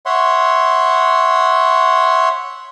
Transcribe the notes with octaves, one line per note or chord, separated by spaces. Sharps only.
C#5 E5 F#5 C6